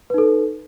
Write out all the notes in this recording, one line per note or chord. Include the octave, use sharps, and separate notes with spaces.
D#4 A4 B4